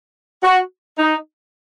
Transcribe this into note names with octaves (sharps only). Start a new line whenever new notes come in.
F#4
D#4